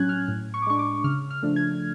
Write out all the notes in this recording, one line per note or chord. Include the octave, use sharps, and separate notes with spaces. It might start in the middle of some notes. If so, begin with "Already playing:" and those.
Already playing: A2 F#3 C#4 F#6 G#6
F6
A2
C#6
D6
G#3 D4 C#6
D6
C#3 F6
F6
F3 A3 D4
G#6